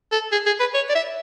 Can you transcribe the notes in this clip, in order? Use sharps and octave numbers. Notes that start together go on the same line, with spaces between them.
A4
G#4
G#4
B4
C#5
D5
E5